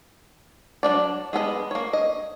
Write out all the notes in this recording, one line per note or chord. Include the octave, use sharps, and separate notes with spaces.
F#3 A#3 D4 D5
G#3 B3 A4 D#5
A#3 C#5
D#5